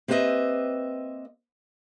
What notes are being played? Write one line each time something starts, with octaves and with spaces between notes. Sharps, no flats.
A#3 C4 G4 B4 D#5 E5